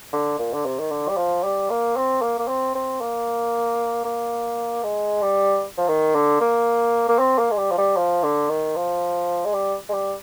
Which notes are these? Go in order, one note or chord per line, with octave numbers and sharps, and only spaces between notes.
D3
A#2
D3
C3
D#3
D3
G3
F3
G3
A#3
C4
A#3
A#3
C4
C4
A#3
A#3
G#3
G3
F3
D#3
D3
A#3
A#3
C4
A#3
G#3
G3
F3
G3
F3
D3
D#3
F3
G#3
G3
G#3
G3